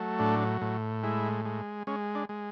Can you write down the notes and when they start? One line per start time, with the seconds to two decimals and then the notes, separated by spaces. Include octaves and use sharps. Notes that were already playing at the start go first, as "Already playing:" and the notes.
Already playing: F#3 A3
0.19 A2 D4
0.61 A2
1.03 G#3 E4
1.45 G#3
1.87 G#3 C#4
2.15 D4
2.29 G#3